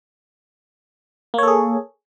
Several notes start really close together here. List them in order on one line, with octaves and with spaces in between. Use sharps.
A#3 C#5 A4 G#4